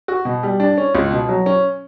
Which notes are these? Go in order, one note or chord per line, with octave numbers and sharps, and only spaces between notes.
F#4
B2
G3
D4
C#4
C#2
B2
F#3
C#4